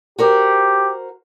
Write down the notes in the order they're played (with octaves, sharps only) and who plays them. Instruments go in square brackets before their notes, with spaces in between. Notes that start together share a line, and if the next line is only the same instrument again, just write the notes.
[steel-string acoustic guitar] F#4 A#4 C5 [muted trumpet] G4